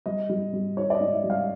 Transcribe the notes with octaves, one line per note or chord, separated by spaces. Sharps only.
G3 D#5
G3
G3
D#3 C#5
D5
D#5
G#2
E5
G3
F5